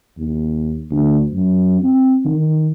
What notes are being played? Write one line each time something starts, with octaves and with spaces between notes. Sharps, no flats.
D#2
D2
F#2
C4
D#3